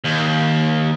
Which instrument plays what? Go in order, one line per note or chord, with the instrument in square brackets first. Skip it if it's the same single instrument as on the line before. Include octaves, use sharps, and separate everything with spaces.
[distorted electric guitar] D#2